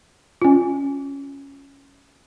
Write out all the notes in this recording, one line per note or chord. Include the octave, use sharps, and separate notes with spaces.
C#4 F4